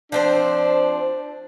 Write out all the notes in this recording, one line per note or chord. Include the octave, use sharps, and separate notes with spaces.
F3 C4 D4 C5